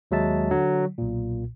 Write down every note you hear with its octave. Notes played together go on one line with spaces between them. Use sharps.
D#2 F#3 G#3 E5 A5
D3 F#3
B1 A#2